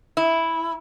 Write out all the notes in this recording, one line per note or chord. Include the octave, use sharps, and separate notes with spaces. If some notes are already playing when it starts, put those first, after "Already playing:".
E4